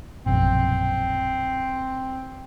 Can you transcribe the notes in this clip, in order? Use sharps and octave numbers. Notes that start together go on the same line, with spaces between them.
A#1 F#2 B2 C4